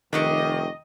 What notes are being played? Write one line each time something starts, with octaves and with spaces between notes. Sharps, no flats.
F1 D#3 D4 G4 D#5 C#6